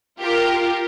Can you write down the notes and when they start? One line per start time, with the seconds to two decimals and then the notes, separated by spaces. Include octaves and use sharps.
0.20 F4 G4 A#4